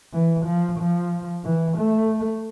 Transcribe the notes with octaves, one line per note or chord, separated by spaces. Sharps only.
E3
F3
F3
E3
A3